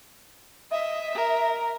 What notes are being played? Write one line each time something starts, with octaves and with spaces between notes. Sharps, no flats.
D#5 E5
A#4